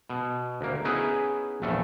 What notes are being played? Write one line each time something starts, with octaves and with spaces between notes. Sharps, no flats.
B2
D2 A#3
B3 C#4 D#4 E4 G#4 B4
A#1 E2 A3